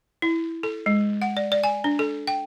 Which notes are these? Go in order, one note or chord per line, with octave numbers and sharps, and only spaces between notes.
E4
A4
G#3
F#5
D5
D5
G#5
D4
A4
G5